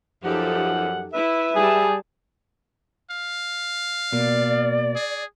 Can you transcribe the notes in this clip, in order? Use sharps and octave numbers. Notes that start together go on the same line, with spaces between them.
F#2 F3 D#4 G4 A4 F#5
E4 B4 E5
G3 G#4 A5
F5
B2 A#3 D5
G#4